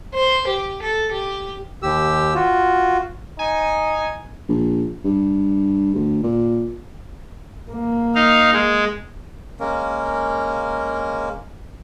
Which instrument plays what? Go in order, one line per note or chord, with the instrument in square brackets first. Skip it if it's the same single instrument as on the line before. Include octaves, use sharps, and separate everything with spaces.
[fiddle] C5
G4
A4
G4
[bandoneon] D#2 G4 E6
F4 F#4
[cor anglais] D#4 [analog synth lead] G#5
[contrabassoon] A#1
G2
D2
A#2
[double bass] A#3
[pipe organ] D#4 F5
G#3
[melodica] G#3 A#3 C#4 A#4